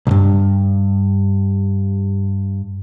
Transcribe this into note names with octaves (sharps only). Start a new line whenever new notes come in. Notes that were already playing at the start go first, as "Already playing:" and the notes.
B1 G2